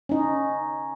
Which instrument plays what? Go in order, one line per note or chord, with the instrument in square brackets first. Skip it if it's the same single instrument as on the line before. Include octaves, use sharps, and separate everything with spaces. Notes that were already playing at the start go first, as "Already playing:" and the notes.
[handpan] C#4 D#4